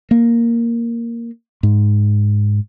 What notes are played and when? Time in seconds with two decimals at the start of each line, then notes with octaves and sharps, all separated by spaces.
0.11 A#3
1.63 G#2